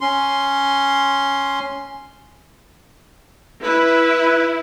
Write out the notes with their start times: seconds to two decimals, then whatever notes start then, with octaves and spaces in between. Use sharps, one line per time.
0.01 C#4 C6
3.62 E4 B4